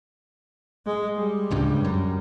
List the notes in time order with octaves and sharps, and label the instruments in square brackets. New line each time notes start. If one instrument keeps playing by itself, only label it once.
[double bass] G#3
G3
[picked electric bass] D1 C#2 G2
F#2